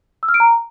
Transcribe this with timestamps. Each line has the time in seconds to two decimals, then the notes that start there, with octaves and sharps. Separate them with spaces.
0.23 E6
0.29 F6
0.34 D7
0.40 A#5